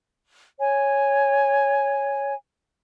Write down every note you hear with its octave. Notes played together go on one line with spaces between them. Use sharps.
C#5 G#5